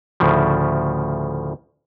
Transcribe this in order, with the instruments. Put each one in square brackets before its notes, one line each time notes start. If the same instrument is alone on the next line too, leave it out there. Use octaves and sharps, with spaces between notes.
[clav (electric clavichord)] D2 A2 C#3 F3